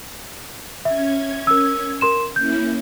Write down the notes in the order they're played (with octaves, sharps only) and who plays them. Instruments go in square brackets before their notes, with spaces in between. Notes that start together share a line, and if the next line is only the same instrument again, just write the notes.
[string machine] C#4 G#6 [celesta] E5
[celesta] A#4 E6
A#4 C6 E7
[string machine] A#3 C#4 E4 [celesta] G6